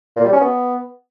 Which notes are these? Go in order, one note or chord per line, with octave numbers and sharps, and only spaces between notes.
A#2
G3
C#4
B3